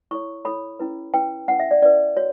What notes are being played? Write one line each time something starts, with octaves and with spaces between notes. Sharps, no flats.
E4 A4 C#5 C#6
E4 A4 C#5 B5
C#4 E4 B4
C#4 E4 B4 G5
C#4 E4 B4 F#5
E5
D5
C#4 E4 B4 D5
F#4 C#5